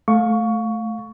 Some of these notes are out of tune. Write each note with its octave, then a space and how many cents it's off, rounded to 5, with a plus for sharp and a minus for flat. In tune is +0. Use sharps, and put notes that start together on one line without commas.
A3 -10 F5 +20 C#6 +15